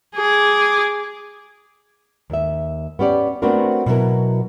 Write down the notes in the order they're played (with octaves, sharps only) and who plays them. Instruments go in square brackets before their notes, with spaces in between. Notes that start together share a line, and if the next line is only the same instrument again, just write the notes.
[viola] G#4 D6
[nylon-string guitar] D#2 E5
B3 C#4 G4 D5
A3 B3 C4 D4 F#4 A#4
B2 F#3 E4 A#4